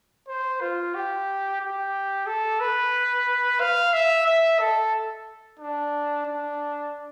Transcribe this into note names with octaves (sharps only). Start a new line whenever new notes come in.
C5
F4
G4
G4
A4
B4
F5
E5
E5
A4
D4
D4